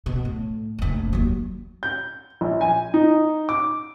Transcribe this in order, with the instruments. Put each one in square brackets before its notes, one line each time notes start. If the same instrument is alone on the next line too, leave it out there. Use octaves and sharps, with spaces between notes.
[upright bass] B2
A2
F1 A#1
D#2 F#3
[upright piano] G6
A#1
G#5
D#4
D6